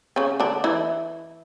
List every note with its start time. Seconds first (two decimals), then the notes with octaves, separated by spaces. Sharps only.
0.16 C#3 C#4
0.40 D3 D4
0.64 E3 E4